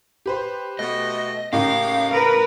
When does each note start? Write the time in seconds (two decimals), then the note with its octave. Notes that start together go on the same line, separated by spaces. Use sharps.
0.26 G4 B4 C5
0.79 B2 A3 D#5
1.53 A2 C#3 A#3 D#4 G4 F5
2.08 A#4 B4